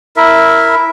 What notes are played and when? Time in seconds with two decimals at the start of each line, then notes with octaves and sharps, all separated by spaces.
0.17 E4 A#4 E5